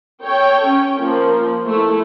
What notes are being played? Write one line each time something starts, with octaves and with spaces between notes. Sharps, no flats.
A4 C#5 G5
C#4
F3 A#3
A3 E4